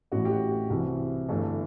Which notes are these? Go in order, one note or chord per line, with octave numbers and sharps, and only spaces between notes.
A1 A2 E3 F#4
G4
F#4
F#4
C2 C3 E3
G1 G2 E3 A3